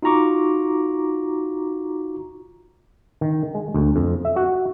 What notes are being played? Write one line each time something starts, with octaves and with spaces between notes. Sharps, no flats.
D#4 F4 F#4 A#5 C#6 D6
D#3
G#3
D2
F2
E5
F#4